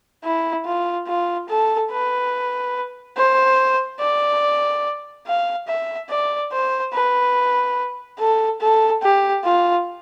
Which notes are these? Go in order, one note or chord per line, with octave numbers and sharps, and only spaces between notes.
E4
F4
F4
A4
B4
C5
D5
F5
E5
D5
C5
B4
A4
A4
G4
F4